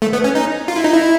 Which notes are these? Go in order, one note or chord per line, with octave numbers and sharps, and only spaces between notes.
A3
B3
C#4
D#4
F4
E4
D#4
E4